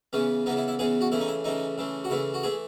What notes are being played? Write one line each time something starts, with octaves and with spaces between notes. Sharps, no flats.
C#3 E3 B3 C#4
C#3 E3 B3 D#4
E4
E4
C#3 E3 B3 G#4
F#4
C#3 E3 A3 E4
D#4
E4
C#3 E3 A3 D#4
C#3 E3 A3
F#4
C#3 E3 A3 E4
F#4
E3 A3 G#4